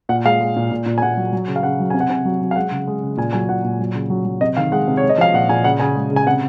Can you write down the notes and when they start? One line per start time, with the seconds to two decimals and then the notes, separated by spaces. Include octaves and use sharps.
0.09 A#2 F#5
0.25 G#3 F5
0.41 G#3
0.56 A#2
0.71 A#2
0.86 A#2
0.98 G#5
1.02 A#2 F#5
1.17 F#3
1.33 F#3
1.48 C#3
1.56 F5
1.63 C#3 F#5
1.80 F#3
1.90 C3 G#5
2.00 F#5
2.10 C3 G#5
2.25 F#3
2.41 F#3
2.51 F5
2.56 G#3 F#5
2.71 C#3
2.88 G#3
3.02 C#3
3.17 A#2 G#5
3.33 F#3 G#5
3.49 A#2 F#5
3.64 A#2
3.79 F#3
3.94 C#3
4.10 F#3
4.25 F#3
4.41 C3 D#5
4.57 D#3 F5
4.72 G#3 F#5
4.88 C3
4.97 C#5
5.03 G#3
5.09 D#5
5.18 F3 F5
5.34 A#2 F#5
5.49 A#2 G#5
5.64 C#3 F#5
5.80 C#3 G#5
5.95 G#3
6.11 C#3
6.16 G#5
6.27 C3 F#5